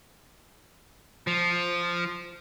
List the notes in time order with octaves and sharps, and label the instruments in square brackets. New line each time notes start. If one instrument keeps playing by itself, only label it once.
[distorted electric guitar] F3